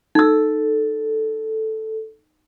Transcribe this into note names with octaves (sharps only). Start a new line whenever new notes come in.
D#4 A4 E6